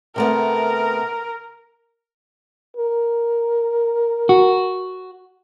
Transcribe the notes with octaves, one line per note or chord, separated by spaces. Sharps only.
C3 A3 B3 A#4
A#4
F#4